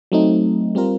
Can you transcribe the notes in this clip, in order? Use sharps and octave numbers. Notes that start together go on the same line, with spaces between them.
F#3 A3 C4 D#4
G3 C4 F4 A#4